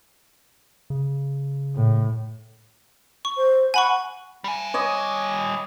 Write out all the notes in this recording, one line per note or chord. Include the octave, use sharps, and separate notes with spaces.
C#3
A2
C#6
C5
F#5 G#5 B5 C#6
G3 G#5
C#5 D#5 D6